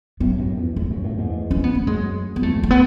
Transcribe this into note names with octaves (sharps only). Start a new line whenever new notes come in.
F#2 A2 B3
F#2
E2
E2 A3
F#2
F#2 A2
E2 G#2
C#4
B3
A3
F#2 G#3
B3
E2 A3
E2
A3
B3